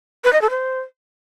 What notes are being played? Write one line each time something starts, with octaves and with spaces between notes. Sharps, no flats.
B4
D#5
A4
C5